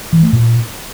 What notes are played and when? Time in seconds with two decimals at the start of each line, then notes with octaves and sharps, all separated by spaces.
0.13 E3
0.23 A3
0.33 A#2